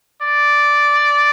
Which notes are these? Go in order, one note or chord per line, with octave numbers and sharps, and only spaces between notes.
D5